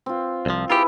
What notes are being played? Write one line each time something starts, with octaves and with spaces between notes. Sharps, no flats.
C4 F4
C2 F3
E4 F4 G4 G#4 B4